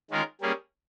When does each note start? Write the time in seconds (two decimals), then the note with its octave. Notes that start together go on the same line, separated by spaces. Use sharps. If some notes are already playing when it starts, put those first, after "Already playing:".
0.11 D#3 G#3 C#4 F4 A#4
0.41 G3 A#3 C#4 G#4